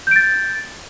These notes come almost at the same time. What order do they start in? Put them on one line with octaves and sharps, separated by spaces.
G6 D7 A6